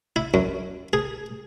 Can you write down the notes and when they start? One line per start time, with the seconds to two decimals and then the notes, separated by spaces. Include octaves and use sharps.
0.16 E4
0.34 F#2
0.93 G#4